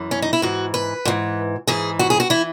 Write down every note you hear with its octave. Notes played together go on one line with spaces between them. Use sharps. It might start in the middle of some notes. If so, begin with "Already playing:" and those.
Already playing: F#2 E3
C#4
D#4
E4
G#2 E3 F#4
B4
G#2 E3
G#2 E3 G#4
F#4
G#4
F#4
E3 E4